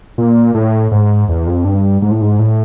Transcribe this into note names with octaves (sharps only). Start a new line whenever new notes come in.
A#2
A2
G#2
E2
F2
G2
G#2
A2
G#2
A2